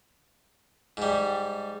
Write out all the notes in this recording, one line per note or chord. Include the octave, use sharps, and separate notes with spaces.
G#2 G3